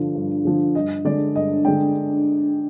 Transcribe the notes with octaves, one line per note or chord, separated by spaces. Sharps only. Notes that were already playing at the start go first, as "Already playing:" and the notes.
Already playing: G2 D3 F3
G2
D3 F3
G2 D#5
D3 G#3 D4 D5
G2 D#5
D3 G#3 D4 G5